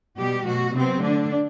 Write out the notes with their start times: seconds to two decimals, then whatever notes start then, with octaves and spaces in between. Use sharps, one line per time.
0.17 B2 G3 B3 G4
0.45 B2 F#3 A3 F#4
0.74 C3 F#3 B3 C4
1.02 D3 A3 D4